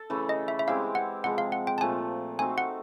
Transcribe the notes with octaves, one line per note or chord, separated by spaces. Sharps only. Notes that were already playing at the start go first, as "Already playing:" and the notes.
Already playing: A4
C#3 E3 A3
D#5
E5
E5
G#3 C4 E4 G4 F5
F#5
C3 F3 G#3 F#5
F5
F#5
G5
A5
A#2 F3 A3 G#5
A3 C4 D#4 F#4 G#5
F#5